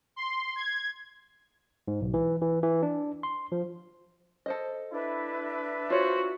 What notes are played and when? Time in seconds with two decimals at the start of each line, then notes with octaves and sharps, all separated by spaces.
0.16 C6
0.56 G#6
1.88 G#2
2.01 B1
2.14 E3
2.42 E3
2.63 E3
2.83 D4
3.23 C6
3.52 F3
4.46 A4 C5 D#5
4.92 D4 E4 B4 E5
5.90 F4 F#4 C5 C#5